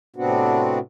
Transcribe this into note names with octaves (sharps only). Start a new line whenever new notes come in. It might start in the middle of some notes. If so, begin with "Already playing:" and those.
A2 C3 B3 C4 D4 F#4